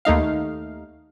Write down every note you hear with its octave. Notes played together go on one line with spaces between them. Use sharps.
D#2 A3 D#4 F5